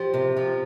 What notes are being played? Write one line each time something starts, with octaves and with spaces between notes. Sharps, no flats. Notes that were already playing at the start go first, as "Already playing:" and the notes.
Already playing: F3 G4
C3
F3